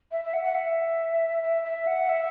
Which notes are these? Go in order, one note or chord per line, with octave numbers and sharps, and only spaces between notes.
E5
E5
F#5
F#5
E5
E5
E5
F#5
E5